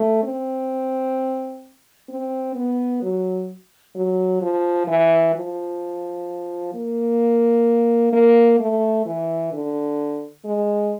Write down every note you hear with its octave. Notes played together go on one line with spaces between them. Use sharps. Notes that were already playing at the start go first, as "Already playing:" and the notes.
Already playing: A3
C4
C4
B3
F#3
F#3
F3
E3
F3
A#3
A#3
A3
E3
D3
G#3